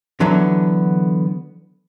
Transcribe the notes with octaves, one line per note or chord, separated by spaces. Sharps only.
D3 E3 F#3 A3 B3 D4